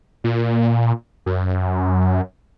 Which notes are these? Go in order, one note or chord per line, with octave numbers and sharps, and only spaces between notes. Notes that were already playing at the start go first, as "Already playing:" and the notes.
A#2
F#2